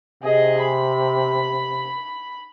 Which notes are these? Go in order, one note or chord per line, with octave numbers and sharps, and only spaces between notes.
C3 G#4 D#5
B5